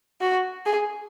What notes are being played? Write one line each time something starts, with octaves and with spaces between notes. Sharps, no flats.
F#4
G#4